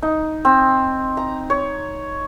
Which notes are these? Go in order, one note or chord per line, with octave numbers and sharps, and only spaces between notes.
D#4
C4
A#5
C#5